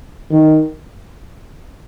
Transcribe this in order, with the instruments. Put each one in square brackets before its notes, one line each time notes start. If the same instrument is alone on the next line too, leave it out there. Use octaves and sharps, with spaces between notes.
[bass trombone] D#3